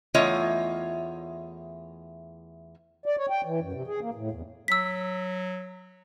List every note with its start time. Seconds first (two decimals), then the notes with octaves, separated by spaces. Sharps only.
0.14 E2 A3 F4 C#5 D#5
3.06 D5
3.17 C#5
3.30 G5
3.45 E3
3.60 F#2
3.73 C3
3.87 G#4
4.01 A#3
4.14 A2
4.31 E2
4.68 F#3 E6 B6